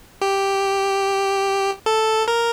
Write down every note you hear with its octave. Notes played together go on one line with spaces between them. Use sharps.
G4
A4
A#4